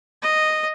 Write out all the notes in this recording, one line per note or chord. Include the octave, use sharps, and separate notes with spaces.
D#5